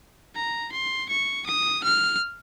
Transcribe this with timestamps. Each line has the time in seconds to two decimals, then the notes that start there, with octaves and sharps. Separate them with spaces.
0.35 A#5
0.72 C6
1.09 C#6
1.47 D#6
1.84 F6